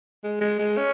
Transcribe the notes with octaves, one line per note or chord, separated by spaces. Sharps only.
G#3
G#3
G#3
C#4